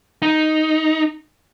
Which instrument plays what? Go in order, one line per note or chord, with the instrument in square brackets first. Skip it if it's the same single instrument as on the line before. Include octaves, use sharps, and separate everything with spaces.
[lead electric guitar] D#4